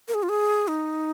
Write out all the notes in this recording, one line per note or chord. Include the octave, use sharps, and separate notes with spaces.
A#4
G#4
F4
G#4
D#4